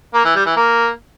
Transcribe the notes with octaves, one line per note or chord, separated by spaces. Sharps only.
A#3
E3
G3
E3
A#3